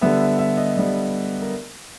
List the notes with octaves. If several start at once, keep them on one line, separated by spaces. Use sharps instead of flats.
D3 G3 B3 E5
E5
E5
D#5
D3 G3 B3 D5
A#4